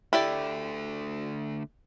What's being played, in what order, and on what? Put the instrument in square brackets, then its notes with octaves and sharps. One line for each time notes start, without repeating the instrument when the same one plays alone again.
[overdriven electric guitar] D3 A3 [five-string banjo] E4 G4 D5